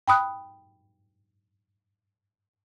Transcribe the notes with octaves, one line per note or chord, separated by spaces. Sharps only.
G5 B5 D#6 F#6